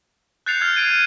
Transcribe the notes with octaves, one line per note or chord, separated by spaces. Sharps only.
F#6 G6 A6 C7 C#7 F7
F6 G#6 C7
F6 C7 D7 D#7
G#6 D#7